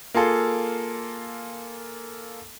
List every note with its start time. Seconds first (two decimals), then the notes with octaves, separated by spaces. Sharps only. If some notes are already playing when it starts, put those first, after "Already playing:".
0.14 A#3 F4 G#4 A4